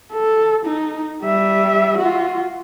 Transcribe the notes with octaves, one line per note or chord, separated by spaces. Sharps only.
A4
D#4
G3 E5
F4 F#4